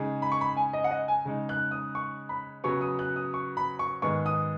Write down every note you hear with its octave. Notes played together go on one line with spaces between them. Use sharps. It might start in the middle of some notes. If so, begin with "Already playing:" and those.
Already playing: C#3 G#3 D#4 G#4
B5
C#6
B5
G#5
D#5
F#5
D#5
G#5
C#3 G#3 D#4
F#6
D#6
C#6
B5
C#3 F#3 B3 C#6
D#6
F#6
D#6
C#6
B5
C#6
G#2 D#3 B3 G#4 C#6
D#6